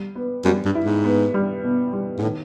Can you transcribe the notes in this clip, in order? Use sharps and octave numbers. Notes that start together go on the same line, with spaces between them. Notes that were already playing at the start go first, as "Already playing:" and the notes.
Already playing: G3
B3
F#2 G3
G2
E4
G#2
B3
G3
B2
G3
G#2
A2 D#3